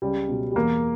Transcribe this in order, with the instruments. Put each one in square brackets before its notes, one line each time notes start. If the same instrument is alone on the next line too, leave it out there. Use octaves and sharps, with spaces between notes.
[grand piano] C#2 G3
B2 F#3
G3
E2 A#3